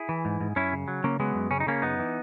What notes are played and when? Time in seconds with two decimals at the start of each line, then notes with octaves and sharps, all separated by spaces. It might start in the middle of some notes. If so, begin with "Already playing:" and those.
Already playing: E4 G#4
0.09 E3
0.25 G#2
0.41 G#2
0.56 F#2 C#4 E4
0.73 C#3
0.88 F#3
1.04 C#3 A#3 C#4
1.20 F#3 G#3 B3
1.35 F#2
1.51 C#3 C#4
1.60 D#4
1.67 C#3 A#3 C#4
1.82 F#2 B3 D#4
1.99 E3